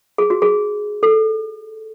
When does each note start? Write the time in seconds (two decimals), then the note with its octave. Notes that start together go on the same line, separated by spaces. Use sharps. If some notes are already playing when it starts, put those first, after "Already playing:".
0.18 G#4
0.30 F#4
0.42 G#4
1.03 A4